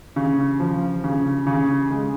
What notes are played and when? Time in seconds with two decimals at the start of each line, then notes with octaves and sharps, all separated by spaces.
0.16 C#3
0.60 F3
1.04 C#3
1.47 C#3
1.91 G#3